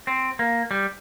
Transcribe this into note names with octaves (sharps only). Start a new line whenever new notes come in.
C4
A#3
G3